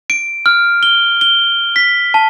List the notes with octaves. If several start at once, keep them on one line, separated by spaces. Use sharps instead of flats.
D7
F6
G7
G7
B6
A5